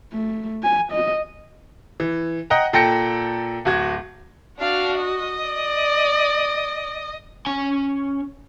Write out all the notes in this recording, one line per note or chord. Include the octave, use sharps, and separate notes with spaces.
A3
G#5
D#5
E3
D#5 F#5 G5 A#5
A#2 A4 G5 A#6 C#7
D1 F#4 G#6
D4 F#4 F5
D#5
D5
C#4 G#5